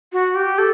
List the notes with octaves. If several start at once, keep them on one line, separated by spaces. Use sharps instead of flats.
F#4
G4
A4